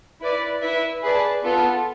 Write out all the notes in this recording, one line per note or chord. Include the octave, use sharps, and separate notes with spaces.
E4 B4 D5
E4 B4 E5
G#4 B4 D5 A5
B3 F4 A4